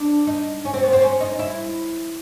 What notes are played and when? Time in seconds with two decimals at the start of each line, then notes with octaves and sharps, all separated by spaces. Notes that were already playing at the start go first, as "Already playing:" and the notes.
Already playing: D4
0.27 D#4
0.65 C#4
0.74 C4
0.83 B3
0.93 C4
1.02 C#4
1.20 D#4
1.39 E4